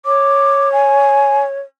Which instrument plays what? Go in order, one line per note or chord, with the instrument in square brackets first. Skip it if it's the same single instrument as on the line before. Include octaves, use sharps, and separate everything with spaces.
[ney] C#5 [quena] D6
[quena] G#5